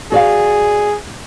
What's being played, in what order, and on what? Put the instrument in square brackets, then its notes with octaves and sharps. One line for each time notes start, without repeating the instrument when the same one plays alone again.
[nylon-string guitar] F#4 D5 F5 [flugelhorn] G#4